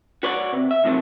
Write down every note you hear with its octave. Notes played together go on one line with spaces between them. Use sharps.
F#4 B4 C#5 D5 F#5
C3
E5
F2 A2 C3 D#3 E3 F#3